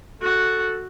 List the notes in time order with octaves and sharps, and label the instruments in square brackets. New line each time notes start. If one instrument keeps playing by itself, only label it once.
[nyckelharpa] F#4 [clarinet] A4